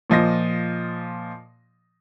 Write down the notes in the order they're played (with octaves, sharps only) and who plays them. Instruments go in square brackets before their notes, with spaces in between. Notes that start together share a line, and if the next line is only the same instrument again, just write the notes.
[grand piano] A#2 F3 D#5 A#6